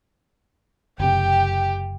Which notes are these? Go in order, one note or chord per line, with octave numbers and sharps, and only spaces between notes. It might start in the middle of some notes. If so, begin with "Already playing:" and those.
F#1 C3 G4 G5